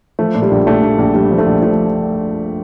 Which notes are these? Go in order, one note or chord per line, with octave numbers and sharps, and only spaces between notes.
F3 A3
A#2
G3
A#1
A#1 A3
A#1
A#1
A#1 G3
F3
A3
A#1
F3 A3